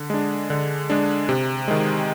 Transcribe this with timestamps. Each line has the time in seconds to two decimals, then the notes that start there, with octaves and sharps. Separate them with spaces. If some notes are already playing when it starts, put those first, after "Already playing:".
Already playing: D3
0.10 G#3 D4
0.50 D3
0.90 G#3 D4
1.29 C3
1.68 D#3 G#3